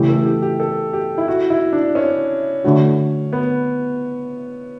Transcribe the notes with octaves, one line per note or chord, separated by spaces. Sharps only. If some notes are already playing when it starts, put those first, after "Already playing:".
Already playing: C#3 E3 A3 G4
A4
G4
G4
A4
G4
E4
F#4
E4
D4
C#4
D3 A3 D4 F#4
B3